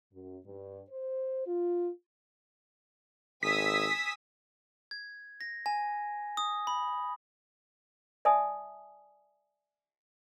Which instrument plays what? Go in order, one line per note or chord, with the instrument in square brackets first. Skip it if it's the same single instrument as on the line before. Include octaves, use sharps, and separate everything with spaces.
[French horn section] F#2
G2
C5
F4
[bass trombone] G#1 [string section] G#5 D#6 E6 [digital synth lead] B6
[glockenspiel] G#6
A#6
G#5
D#6
B5
[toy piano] D5 E5 G#5 A5 D#6